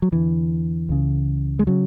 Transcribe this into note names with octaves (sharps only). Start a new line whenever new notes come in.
F#3
E2 D3 E3
C#2 C#3
G#3
C#3 F#3